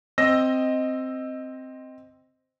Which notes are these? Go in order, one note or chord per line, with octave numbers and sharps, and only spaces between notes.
C4 D#5 E6 A#6